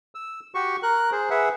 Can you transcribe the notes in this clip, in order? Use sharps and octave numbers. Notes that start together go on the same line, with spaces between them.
E6
F#4 G4 C#6
A#4 F#6
G#4 C5
G#4 B4 E5 F#5